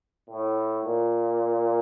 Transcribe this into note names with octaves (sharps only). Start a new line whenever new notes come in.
A2
A#2